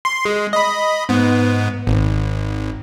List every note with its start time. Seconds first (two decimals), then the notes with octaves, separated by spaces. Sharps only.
0.05 C6
0.25 G#3
0.53 D#5 B5
1.09 G#2 B3
1.87 G#1